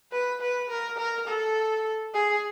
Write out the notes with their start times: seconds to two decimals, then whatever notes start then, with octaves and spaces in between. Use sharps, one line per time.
0.12 B4
0.41 B4
0.70 A#4
0.98 A#4
1.28 A4
2.14 G#4